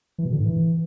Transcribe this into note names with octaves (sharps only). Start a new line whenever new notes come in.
E3
B2
D3
G#2
E3